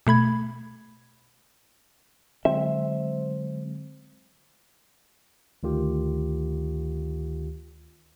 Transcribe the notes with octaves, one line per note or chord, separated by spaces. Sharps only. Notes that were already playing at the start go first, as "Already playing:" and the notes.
B2 A3 B5 G#6
D3 F#3 G#3 C4 E5
D2 D#3 F4 G4